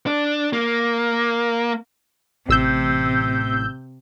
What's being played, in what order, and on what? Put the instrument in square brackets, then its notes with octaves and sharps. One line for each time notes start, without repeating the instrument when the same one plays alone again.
[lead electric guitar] D4
A#3
[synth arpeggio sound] A1 E6 G6 [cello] C3